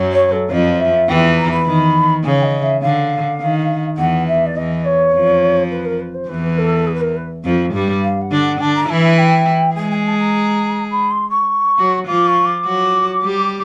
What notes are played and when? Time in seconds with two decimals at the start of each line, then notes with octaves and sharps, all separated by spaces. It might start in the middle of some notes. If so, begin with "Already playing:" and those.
Already playing: F#2 F#3
0.13 C#5
0.32 A4
0.50 F2 F3 D#5
0.80 E5
1.09 E2 E3 G5
1.38 A#5
1.52 B5
1.67 D#3
2.24 C#3 G#5
2.43 D#5
2.62 E5
2.82 D3 F5
3.40 D#3
3.97 E2 E3 F#5
4.27 E5
4.46 D5
4.55 E2 E3 D#5
4.85 C#5
5.14 F2 F3
5.71 B4
5.86 A#4
6.00 B4
6.14 C5
6.29 E2 E3 B4
6.58 A4
6.87 G#4
6.94 B4
7.01 A#4
7.16 B4
7.45 F2 F3
7.74 G2 G3
8.02 F5
8.21 F#5
8.31 D3 D4
8.41 F#5
8.60 D3 D4 A5
8.75 A#5
8.89 E3 E4 G#5
9.04 G#5
9.18 G5
9.76 G#3 G#4 G#5
9.91 G#5
10.05 A5
10.19 A#5
10.91 B5
11.11 C6
11.30 C#6
11.78 F#3 F#4
12.07 F3 F4 D6
12.27 C#6
12.46 D6
12.65 F#3 F#4
13.22 G3 G4